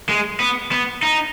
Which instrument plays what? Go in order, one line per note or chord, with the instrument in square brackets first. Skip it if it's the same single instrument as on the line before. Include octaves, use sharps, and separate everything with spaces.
[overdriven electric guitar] G#3
B3
B3
D#4